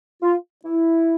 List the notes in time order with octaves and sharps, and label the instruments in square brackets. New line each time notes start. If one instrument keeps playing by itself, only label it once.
[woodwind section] F4
E4